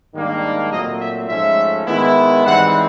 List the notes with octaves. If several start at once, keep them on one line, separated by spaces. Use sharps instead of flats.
G#2 D#3 G3 A#3 D4
A#2 F#3 A3 C4 D#5
E5
G#2 F3 A3 C#4 E5
D#3 G#3 B3 E4
G#2 E3 G3 C4 E4 F#5